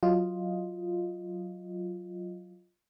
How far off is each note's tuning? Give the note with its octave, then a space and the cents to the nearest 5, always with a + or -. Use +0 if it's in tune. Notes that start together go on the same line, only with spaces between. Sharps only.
F#3 -5 F4 +0 D#5 +0